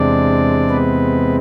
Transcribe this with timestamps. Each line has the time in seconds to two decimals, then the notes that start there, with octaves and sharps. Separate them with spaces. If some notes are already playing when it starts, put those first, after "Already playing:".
Already playing: E2 C3 G#3 C4 D4 D5
0.70 B3 B4